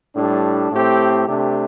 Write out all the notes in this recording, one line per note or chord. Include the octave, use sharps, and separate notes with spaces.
A2 G3 D4
A2 A3 C4 G4
C3 A3 D4 G4